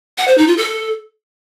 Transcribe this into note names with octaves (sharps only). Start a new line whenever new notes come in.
F#5
C5
D#4
F4
A4